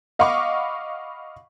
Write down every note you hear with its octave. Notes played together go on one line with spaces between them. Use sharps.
D#5 F5 F#5 B5 C#6 D6